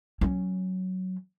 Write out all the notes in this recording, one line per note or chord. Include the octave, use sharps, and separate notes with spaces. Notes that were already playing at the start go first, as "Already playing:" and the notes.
F#3 C#4